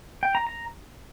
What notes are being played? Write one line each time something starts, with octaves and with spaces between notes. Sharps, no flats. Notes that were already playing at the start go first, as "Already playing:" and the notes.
G5
A#5
A#5